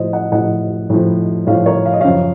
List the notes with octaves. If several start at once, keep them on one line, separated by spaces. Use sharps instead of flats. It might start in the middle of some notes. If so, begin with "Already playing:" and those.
Already playing: A2 F3 C5 D#5
D#5 F#5
A2 F3 D#5 F#5
A2 F3
A2 F3 C#5 F5
A#4 C#5
F5
D#5
F#2 C#3 F3 C#5 F5